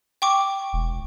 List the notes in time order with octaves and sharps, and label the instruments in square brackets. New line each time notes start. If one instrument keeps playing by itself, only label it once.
[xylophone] G5 C#6 D6
[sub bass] E1